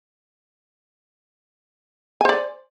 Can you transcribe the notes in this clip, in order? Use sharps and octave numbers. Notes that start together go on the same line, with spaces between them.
C5 D5 G#5